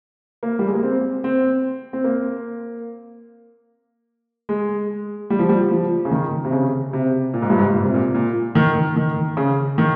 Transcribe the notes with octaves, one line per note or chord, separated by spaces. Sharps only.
A#3
G3
G#3
A#3
C4
C4
C4
A#3
G#3
G3
F3
G3
F3
C#3
D#3
C3
C#3
C3
A#2
G#2
G2
G#2
A#2
C3
A#2
A#2
D#3
D#3
C#3
D#3